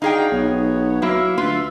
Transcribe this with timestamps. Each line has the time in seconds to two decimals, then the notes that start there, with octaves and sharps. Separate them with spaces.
0.02 D4 D#4 F#4 G#4 F5 G5
0.32 B1 B3 C#5
1.02 F#3 A#3 E4 E5 F5
1.38 D2 F4 B4